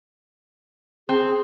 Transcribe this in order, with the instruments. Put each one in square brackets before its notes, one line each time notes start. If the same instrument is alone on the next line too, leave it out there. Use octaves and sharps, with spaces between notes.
[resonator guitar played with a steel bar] C4 [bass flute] G#4